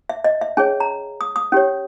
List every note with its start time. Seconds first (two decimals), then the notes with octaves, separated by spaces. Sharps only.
0.09 E5
0.24 D#5
0.41 E5
0.57 C#4 G#4 C#5 G#5
0.80 A#5
1.21 D#6
1.36 D#6
1.52 C#4 G4 C#5